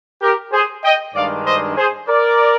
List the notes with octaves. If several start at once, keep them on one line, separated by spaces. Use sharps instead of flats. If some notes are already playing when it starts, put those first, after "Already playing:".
G4 A#4
G#4 C5
D#5 G5
G2 D#3 G#3 D4 D5 F5
C5 D#5
G#4 C5
A#4 D5